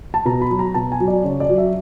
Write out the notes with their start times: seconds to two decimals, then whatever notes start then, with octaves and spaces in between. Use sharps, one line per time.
0.14 A5
0.25 B2 A#5
0.42 B5
0.50 F#3
0.59 A#5
0.74 B2 A5
0.92 G#5
1.00 F#3
1.08 D5
1.24 C#3 C#5
1.40 D5
1.49 F#3
1.58 E5